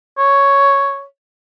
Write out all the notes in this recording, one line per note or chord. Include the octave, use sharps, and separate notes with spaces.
C#5